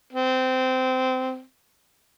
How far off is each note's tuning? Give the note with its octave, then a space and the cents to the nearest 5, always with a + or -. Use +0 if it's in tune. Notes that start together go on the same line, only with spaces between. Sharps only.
C4 -20